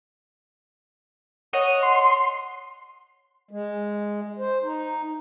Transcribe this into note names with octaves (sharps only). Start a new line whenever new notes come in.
C#5 D#5 F#5
C6
G#3
C5
D#4